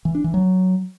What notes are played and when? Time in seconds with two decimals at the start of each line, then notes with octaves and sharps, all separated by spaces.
0.05 E3
0.15 D4
0.24 E3
0.34 F#3